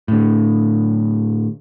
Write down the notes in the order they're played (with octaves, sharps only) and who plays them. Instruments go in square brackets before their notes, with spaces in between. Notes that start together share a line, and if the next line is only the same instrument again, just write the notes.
[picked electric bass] A2 D3